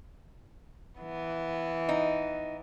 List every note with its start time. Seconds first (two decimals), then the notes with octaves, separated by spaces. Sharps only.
1.00 E3 B3
1.89 D#4